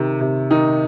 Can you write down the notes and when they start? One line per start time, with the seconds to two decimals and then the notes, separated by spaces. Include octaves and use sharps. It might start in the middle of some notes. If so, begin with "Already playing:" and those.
Already playing: C3 D#3
0.20 C3
0.51 D#3 D#4